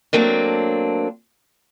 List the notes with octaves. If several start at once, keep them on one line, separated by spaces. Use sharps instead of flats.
F#3 A3 A#3 C4 D4